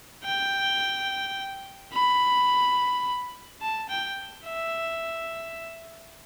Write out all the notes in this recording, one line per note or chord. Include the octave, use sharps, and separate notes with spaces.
G5
B5
A5
G5
E5